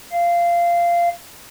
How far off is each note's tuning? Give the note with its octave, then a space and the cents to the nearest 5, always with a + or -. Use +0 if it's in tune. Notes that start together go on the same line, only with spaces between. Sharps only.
F5 -15